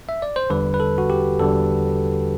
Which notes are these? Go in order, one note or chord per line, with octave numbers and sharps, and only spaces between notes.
E5
D5
C5
E2 D3 G3 B4
B4
A4
F#4
G4
E2 D3 G3 A4